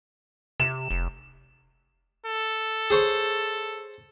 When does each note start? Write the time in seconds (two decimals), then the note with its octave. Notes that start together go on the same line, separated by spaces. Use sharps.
0.60 C3 E7
0.90 F1
2.26 A4
2.90 G#4 C5 C#5